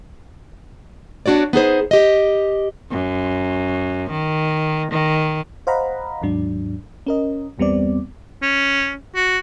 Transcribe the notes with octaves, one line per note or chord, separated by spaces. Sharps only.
B3 D4 F#4 C#5 D5
B3 D#4 G#4 C5
G4 D#5
F#2
D#3
D#3
C5 D#5 F5 F#5 A#5 B5
D#2 G#2 F#3 D4
C#4 A#4 D#5
G1 E2 G3 B3 C4 D5
C#4
F#4